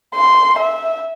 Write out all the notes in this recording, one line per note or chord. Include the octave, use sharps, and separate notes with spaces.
C6
E5